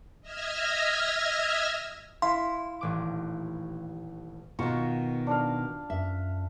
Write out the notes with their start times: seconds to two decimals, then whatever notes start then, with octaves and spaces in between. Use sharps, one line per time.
0.21 D#5 E5 E6 F6 G#6 A#6
2.22 E4 F5 C6
2.81 D#1 A1 D6
4.59 B2 D#3 F4 F#4 C#6
5.27 D4 D5 F5
5.90 F#2 E5